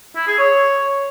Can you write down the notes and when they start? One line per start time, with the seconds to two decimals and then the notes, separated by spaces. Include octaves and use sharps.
0.16 E4
0.27 G#4
0.39 C#5